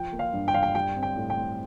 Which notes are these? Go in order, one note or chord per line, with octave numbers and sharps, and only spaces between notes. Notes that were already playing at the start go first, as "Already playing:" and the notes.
Already playing: F3 G5
A#3
F5
G2
G5
G2 F5
G5
G3 G5
C4
G5
A2
G5
A2